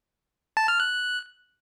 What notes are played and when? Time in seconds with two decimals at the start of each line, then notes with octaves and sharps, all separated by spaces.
0.57 A5
0.68 F6
0.80 F#6